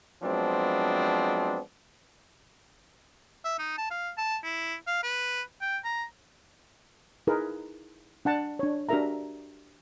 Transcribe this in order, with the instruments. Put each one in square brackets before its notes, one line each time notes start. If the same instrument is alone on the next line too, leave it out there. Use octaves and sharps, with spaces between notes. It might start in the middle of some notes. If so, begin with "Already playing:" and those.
[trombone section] F3 F#3 G#3 B3 C4 D4
[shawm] E5
D#4
A5
F5
A5
E4
F5
B4
G5
A#5
[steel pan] D#4 E4 G#4 A#4 B4
D4 F#5 A5
D4 C#5
D4 F#4 G4 A#4 E5 A#5